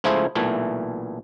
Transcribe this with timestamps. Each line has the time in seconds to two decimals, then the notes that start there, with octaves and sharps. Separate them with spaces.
0.04 C#2 F3 A3 E4 G#4 C5
0.35 B1 A#2 E3 A3